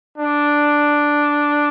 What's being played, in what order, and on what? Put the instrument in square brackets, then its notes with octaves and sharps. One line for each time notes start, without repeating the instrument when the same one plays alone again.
[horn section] D4